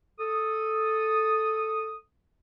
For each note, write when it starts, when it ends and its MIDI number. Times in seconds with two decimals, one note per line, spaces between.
0.20 1.95 69
0.20 1.95 87